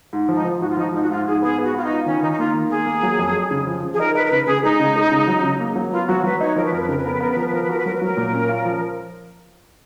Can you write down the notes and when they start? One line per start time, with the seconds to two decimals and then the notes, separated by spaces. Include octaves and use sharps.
0.13 G#2
0.29 F3
0.34 D#4
0.45 F3
0.60 G#2 F#4
0.69 F4
0.77 F3 D#4
0.94 G#2 D#4
1.02 F#4
1.10 G#2 F4
1.25 G#2 G#4
1.42 B3 G#4
1.58 B3
1.64 F#4
1.74 B3 F4
1.85 D#4
1.91 F4
2.06 D#3 C#4
2.22 D#3 D#4
2.32 D#4
2.39 A#3 F4
2.54 D#3
2.70 A#3 G#4
2.86 A#3
3.03 F#3
3.19 F2
3.35 F2
3.51 C#3
3.67 F3
3.83 F3
3.93 G#4
4.00 D#4 A#4
4.15 D#4 B4
4.25 A#4
4.31 C#3 B4
4.47 C#3 G#4
4.63 G#3 D#4
4.80 C#3
4.96 G#3
5.12 C#3
5.28 F#3
5.44 C#3
5.60 A#3
5.76 F#3
5.92 B3 F4
6.08 F#3 F#4
6.24 F#3 B4
6.41 D#4 C#5
6.56 F3 A#4
6.65 B4
6.72 F2 A#4
6.80 B4
6.89 C#3 A#4
6.97 B4
7.05 B3 A#4
7.13 B4
7.20 B3 A#4
7.30 B4
7.36 F3 A#4
7.46 B4
7.53 F3 A#4
7.62 B4
7.69 F#4 A#4
7.78 B4
7.86 F#3 A#4
7.95 B4
8.01 F#3 A#4
8.17 A#2
8.33 C#4
8.49 F4
8.65 F3